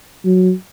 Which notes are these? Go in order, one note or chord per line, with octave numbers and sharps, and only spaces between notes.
F#3